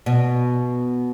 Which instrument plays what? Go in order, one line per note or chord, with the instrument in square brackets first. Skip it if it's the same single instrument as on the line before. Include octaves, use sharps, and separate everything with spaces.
[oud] B2